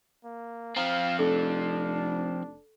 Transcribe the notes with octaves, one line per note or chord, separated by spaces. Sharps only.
A#3
F3 C4 F5 A#5
F1 D4 A4